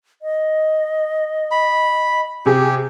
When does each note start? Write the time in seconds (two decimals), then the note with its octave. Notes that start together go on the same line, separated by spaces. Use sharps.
0.22 D#5
1.51 B5
2.46 C3 G4 G#4